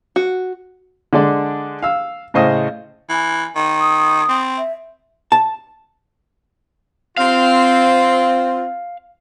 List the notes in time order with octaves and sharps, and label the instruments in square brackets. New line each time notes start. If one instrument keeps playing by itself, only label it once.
[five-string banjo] F#4
[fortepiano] D3 G#3 D4 D5
F5 E6
A2 C#3 C5 D#5 D#6
[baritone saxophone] E3 [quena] G#5
[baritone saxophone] D#3
[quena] D#6
[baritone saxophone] C4
[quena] E5
[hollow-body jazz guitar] A5
[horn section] C4 F4 [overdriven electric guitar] F5